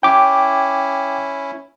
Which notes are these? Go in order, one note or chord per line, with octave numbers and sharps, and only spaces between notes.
C#4 E4 G5 D6